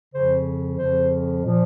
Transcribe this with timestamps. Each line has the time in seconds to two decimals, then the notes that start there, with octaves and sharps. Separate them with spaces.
0.14 F2 C#3 F3 C5
0.78 F2 C#3 F3 C5
1.44 A#2 F3